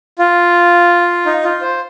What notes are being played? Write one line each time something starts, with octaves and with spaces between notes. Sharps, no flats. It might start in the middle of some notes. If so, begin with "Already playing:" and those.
F4
D#4
F4
C5